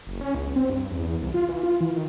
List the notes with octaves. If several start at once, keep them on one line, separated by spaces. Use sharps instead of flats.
F#1
C#4
C#2
C4
G2
E2
C2
F4
E3
F4
E3
D#3